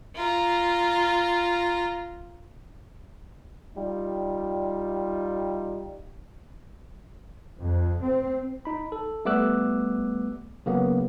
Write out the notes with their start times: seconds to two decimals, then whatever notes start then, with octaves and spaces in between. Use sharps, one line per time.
0.16 F4 A#5
3.77 G3 D#4 F4
7.60 F2
8.01 C4
8.65 D#4 B5
8.92 A4
9.25 G3 A3 B3 D6 E6 F#6
10.66 C#3 F#3 A#3 B3